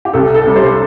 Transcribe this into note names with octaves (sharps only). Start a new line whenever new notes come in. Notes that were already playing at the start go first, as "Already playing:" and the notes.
G4
C2 A4
A4
C3 G3
C5